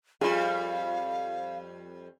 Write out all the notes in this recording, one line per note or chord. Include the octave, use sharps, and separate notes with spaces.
F2 G3 F4 G#4 F5